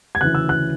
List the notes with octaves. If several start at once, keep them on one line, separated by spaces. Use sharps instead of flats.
G#6
D2 C#3 E3 F#6
E6
F#6